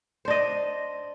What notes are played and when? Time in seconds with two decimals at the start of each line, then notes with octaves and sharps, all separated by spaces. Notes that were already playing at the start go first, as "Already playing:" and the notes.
0.25 C5
0.28 D4
0.30 D#5